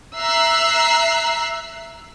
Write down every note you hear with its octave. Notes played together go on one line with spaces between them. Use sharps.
E5 A#5 E6 F#6 C7